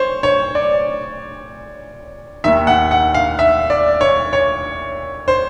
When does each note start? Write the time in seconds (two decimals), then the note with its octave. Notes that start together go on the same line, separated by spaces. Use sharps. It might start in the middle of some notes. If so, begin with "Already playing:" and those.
Already playing: C5 C#5
0.23 C#5
0.55 D5
2.44 D#2 D#3 E5
2.67 F#5
2.91 F#5
3.15 F5
3.39 E5
3.70 D5
4.01 C#5
4.33 C#5
5.28 C5